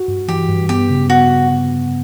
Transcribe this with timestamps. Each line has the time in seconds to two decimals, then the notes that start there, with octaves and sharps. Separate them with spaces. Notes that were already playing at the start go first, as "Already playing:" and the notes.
Already playing: F#4
0.08 G2
0.28 E3 G4
0.49 G2
0.69 B3 G4
0.90 C#3
1.10 B3 F#4